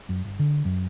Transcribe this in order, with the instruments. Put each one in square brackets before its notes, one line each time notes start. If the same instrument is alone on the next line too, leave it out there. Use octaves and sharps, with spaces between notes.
[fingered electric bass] F#2
G1
D3
F#2